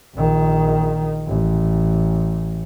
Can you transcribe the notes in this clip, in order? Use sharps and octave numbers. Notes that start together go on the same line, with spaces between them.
A#1 D#3
A1